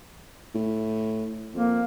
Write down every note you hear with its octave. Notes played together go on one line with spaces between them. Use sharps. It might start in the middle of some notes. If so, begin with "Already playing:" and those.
A2
F2 A#3